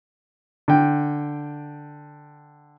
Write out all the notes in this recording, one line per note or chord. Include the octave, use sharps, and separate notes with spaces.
D3 G5